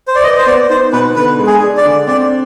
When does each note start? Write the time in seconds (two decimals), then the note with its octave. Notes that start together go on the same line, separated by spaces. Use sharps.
0.08 C5
0.15 D5
0.23 B4 D#5
0.38 C5
0.46 B3 D5
0.70 D#4 C5
0.92 B2 B4
1.16 D3 B4
1.39 G#3
1.47 G#4
1.62 D4
1.77 D5
1.85 D3
2.07 C4 D5